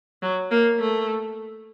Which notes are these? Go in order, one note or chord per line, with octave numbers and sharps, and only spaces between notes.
F#3
A#3
A3